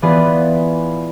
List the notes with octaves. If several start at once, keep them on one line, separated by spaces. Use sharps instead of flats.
E3 B3 F4 G#4 B4 D5